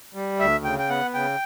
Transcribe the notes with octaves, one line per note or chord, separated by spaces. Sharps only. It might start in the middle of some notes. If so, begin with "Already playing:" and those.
G3
D2 E5
C#3 G5
G5
B3 F#5
C#3 G5